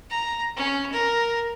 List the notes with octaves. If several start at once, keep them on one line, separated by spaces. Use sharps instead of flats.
A#5
C#4
A#4